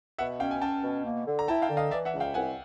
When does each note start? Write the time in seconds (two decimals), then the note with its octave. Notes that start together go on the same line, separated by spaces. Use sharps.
0.18 B2 E5 F#5
0.40 C#4 F5 G5
0.51 G#5
0.61 C#4 G5 A5
0.83 B2
1.05 A#3
1.27 D3
1.39 A#5
1.48 E4 G5 A5
1.62 F5 G5
1.69 D3
1.77 D#5 F5
1.91 E3 D5 E5
2.05 E5 F#5
2.12 C#2
2.20 F5 G5
2.34 C2 F#5 G#5